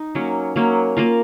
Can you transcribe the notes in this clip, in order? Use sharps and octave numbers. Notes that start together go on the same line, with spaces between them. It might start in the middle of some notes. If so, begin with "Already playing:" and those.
Already playing: D#4
F#3 A#3 C#4
F#3 A#3 C#4
A#3 F4 A#4